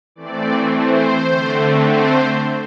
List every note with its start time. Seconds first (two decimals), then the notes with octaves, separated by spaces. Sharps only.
0.15 E3 A3 C4 D5
0.72 C5
1.28 D3 A3 C4
1.84 C5